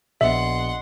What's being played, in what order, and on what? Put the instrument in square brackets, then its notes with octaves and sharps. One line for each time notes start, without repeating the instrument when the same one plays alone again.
[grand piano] A#1 B3 F#7 [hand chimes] D#5 [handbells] E5 [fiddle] F#5 C6